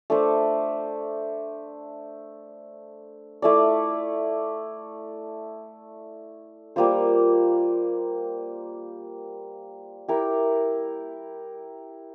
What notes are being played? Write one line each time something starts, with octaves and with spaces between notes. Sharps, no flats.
A3 D4 A4 C5
A3 E4 A4 D5
G3 A#3 F4 C5
E4 G4 A#4